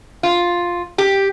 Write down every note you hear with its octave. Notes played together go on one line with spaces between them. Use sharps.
F4
G4